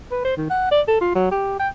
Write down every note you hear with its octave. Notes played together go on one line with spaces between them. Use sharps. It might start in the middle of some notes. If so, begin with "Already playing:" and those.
B4
C5
D#3
F#5
D5
A4
F4
F#3
G4
G5